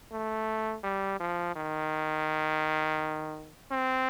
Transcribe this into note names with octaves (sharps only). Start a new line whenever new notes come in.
A3
G3
F3
D#3
C4